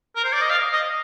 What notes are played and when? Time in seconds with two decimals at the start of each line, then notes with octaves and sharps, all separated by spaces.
0.16 A#4
0.24 C5
0.33 D5
0.41 D#5
0.50 F5
0.73 D#5